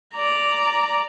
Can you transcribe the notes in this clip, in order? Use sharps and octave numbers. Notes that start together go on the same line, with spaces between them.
D5 A#5